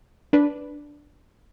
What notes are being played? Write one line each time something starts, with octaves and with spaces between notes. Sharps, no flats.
D4 B4